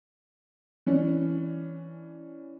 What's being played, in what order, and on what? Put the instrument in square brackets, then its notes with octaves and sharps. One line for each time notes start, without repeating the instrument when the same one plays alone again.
[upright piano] E3 C#4 D4